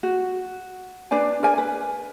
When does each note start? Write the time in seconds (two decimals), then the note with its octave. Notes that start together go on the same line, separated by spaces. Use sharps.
0.03 F#4
1.11 D4 B4 D5 G#5
1.43 A#4 D5 G#5
1.58 B4